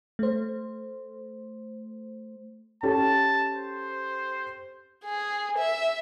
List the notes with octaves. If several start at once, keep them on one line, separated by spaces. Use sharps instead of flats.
A3 C5
C#4 G4 A4 A5
C5
G#4
E5